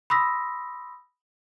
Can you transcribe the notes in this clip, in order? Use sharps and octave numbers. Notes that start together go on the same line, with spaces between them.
B5 C6 D#6 E6 A#6 B6